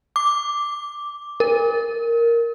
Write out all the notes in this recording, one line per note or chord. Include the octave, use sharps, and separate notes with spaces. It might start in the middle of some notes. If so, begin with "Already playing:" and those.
D6
A#4